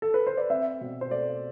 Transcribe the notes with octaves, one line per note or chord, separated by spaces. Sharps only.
A4
B4
C5
D5
C4 E5
B2
C5
A3 D5